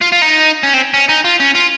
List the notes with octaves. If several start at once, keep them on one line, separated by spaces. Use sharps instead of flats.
F4
F4
D#4
C#4
C4
C#4
D#4
F4
C#4
F4